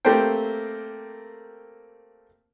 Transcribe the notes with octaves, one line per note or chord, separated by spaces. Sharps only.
A3 A#3 C4 G4 C5 G5